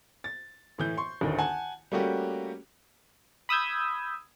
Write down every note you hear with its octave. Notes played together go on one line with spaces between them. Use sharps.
A6
A2 E3 G6
C6 C#6
A1 D2 D#3
F#5 G#5 A5
G3 A3 A#3 C#4 F#4 G4
B5 D#6 E6 G6 G#6